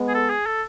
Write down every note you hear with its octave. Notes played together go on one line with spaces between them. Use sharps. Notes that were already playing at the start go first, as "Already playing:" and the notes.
Already playing: G#3 B3
G#4
A4
G#4
A4